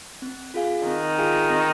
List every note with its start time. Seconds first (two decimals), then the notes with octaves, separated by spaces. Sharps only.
0.22 C4
0.54 F4 G#4 F5 G#5
0.86 D#3 C4
1.18 F4 G#4 F5 G#5
1.50 C4